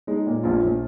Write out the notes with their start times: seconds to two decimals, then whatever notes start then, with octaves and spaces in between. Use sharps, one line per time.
0.07 G#3 D#4
0.27 A#2
0.44 A#1 F4
0.62 A#1